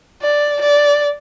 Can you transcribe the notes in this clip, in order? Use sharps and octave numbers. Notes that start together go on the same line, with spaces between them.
D5
D5